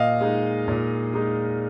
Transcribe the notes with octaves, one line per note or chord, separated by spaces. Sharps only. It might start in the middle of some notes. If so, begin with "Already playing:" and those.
Already playing: A#2 D#5 F5
G#3 D#4
A#2
G#3 D#4